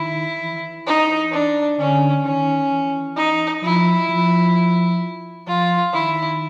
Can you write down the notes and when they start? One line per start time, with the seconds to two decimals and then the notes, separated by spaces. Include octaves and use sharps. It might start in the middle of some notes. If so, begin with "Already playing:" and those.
Already playing: D#3 E4
0.40 E3
0.87 D#4
1.32 D4
1.79 D3 C#4
2.24 D#3 C#4
2.71 E3
3.16 D#4
3.63 F3 E4
4.09 F3
5.47 F3 F4
5.93 D#3 E4